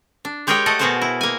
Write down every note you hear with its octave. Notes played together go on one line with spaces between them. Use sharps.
D4
G#3 G4 G#4 A#4 C#5 G5
A3 A4 D#5 F#5
B2 F#4 G#4 A#4 C5 A5
E4
A#3 G#5